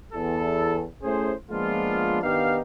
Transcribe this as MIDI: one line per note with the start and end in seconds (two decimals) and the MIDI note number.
0.13 0.84 40
0.13 0.84 69
1.03 1.34 57
1.03 1.34 61
1.03 1.34 64
1.03 1.34 68
1.03 1.34 72
1.50 2.22 53
1.50 2.22 56
1.50 2.22 58
1.50 2.22 59
1.50 2.22 62
1.50 2.22 65
2.22 2.60 51
2.22 2.60 59
2.22 2.60 62
2.22 2.60 63
2.22 2.60 67
2.22 2.60 77